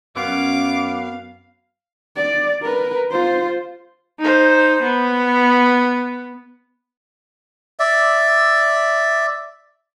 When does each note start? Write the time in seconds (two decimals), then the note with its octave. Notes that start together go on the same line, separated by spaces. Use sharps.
0.16 F#2 B3 C#4 B4 F5 D6
2.16 D5
2.62 A#4 B4
3.12 F4 C5
4.20 D#4 C5
4.83 B3
7.79 D5 E5